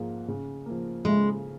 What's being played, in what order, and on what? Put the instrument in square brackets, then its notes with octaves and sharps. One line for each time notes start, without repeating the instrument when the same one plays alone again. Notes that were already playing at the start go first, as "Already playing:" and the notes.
Already playing: [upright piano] G#2 F3 A#3 F4 G#4
C#3
F3 A#3
[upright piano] C#3 [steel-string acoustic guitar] G#3